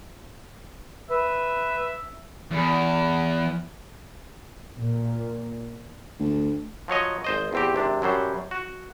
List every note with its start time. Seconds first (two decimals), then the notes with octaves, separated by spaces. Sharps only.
1.10 B4 E5
2.51 E2
4.78 A#2
6.20 D2
6.88 F3 F#3 C#5 D#5
7.24 G#1 C5 D#5
7.53 E2 C4 G4
7.74 G#1 C3 D4
8.02 F#2 F#3 G3 C5
8.51 F#4